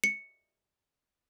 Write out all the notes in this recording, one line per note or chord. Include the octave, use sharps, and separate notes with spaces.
C#7